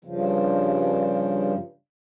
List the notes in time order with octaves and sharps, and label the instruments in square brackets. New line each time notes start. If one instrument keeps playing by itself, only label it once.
[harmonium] G2 C#3 F3